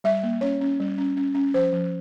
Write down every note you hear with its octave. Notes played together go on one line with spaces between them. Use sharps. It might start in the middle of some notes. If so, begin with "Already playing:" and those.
G3 E5
A#3
C#4 C#5
C#4
G3
C#4
C#4
C#4
F3 C5
F3